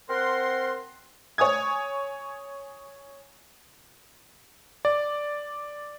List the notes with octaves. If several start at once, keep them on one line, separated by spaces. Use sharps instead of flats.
C4 A#4 F#5 C6
C#5 G#5 D#6 G#6
D5